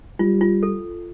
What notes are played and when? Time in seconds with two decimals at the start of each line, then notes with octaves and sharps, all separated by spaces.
0.19 G3 F4
0.41 F4
0.63 A4